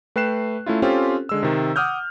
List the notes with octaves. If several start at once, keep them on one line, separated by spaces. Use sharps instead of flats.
A3 B4 G5 F#6 C7 E7
A3 C#4 E4 F4
C4 C#4 F4 G4 A4 C5
D3 G#3 E6
C3 D#3
F#5 D6 D#6 F6 G6